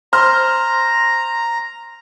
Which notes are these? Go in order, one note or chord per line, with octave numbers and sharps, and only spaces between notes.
C5 A#5 C6 F6